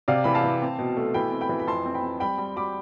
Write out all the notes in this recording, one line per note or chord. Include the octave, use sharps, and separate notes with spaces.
C3 D5 F5
E3 B5
F5 A5
E3
C4
B2
A3
E3 G5 B5
C4
G5 B5
E3
B5
F2 A5 C6
C4
G5 B5
C4
G3 G5 B5
G3
G3 B5 D6